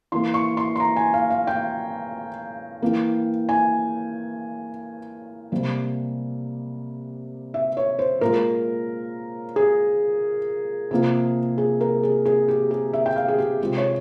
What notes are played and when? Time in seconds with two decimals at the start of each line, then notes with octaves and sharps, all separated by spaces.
0.12 E3 A#3 C6
0.34 C#6
0.57 C6
0.76 C6
0.80 A#5
0.96 G#5
1.14 F5
1.30 F5
1.47 G5
2.82 E3 A#3
3.49 G#5
5.52 C3 G3 A#3
7.54 E5
7.77 C#5
7.99 C5
8.21 A#2 G#3 A#4
9.56 G#4
10.91 C3 F3 A#3
11.58 G#4
11.81 A#4
12.03 G#4
12.25 G#4
12.48 G4
12.71 G#4
12.93 E5
13.06 G5
13.16 F5
13.28 G#4
13.38 G4
13.61 C3 F3 G#3
13.78 C#5